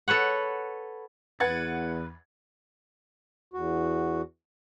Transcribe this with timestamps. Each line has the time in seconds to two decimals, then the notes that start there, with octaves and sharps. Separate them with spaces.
0.08 A4 B4 C#5 F#5
1.40 E2 B4 F#5 G#6 A6
3.54 E2 F#4